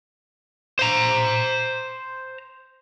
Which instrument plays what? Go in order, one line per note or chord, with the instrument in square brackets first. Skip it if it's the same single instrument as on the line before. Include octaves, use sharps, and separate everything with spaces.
[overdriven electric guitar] C5 A#5